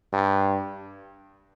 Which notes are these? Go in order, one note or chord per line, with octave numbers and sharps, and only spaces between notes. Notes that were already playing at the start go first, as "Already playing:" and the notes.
G2